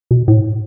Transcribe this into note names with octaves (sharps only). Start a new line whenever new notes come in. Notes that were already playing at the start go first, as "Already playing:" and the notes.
B2
A2